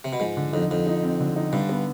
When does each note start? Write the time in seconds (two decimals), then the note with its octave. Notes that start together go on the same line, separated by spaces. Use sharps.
0.04 C3
0.13 B2
0.20 G#2 F3
0.37 D3
0.53 F2 D#4
0.70 F2 F3
0.87 D#4
1.03 C4
1.20 D3
1.36 D#4
1.53 G2 D3
1.69 B3